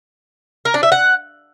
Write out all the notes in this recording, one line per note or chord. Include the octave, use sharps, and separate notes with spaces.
A#4
D4
E5
F#5